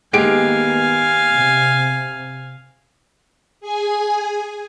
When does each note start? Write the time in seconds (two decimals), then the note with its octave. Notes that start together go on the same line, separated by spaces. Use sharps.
0.13 D#3 G#3 A#3 B3 G4 F5 G#5 D7
1.34 C3
3.61 G#4 G#5